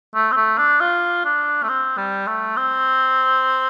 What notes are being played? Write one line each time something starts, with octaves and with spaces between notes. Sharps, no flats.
A3
C4
A3
D4
F4
D4
A3
C4
G3
A3
C4